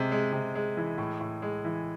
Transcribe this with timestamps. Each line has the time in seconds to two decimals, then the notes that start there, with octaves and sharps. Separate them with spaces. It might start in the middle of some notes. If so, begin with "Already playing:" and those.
Already playing: C3 G#3
0.12 G#3
0.33 C3
0.55 G#3
0.77 E3
0.98 A2
1.21 A2
1.42 G#3
1.64 E3